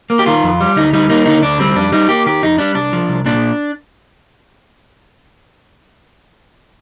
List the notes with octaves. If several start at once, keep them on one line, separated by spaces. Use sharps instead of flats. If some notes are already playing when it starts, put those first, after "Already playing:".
A#3
G4
D#3 F4
F2
G3
D2 D#4
G3 D#4
A#3 D#4
D3 D#4
D2 D4
G3 C4
F2 D4
G3 D#4
A#3 G4
D#3 G4
F2 D#4
G3 D4
C2 D4
F3
C2
A#2 D4